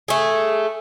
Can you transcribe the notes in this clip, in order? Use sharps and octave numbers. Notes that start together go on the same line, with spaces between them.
A3 G#4